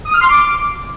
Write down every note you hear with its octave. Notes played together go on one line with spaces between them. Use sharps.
D#6
F6
C6
D6